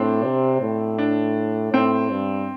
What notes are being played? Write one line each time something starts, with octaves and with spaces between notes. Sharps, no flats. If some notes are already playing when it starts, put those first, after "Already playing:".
Already playing: A2 C4 D4
C3
A2
D4
A2 C4
G2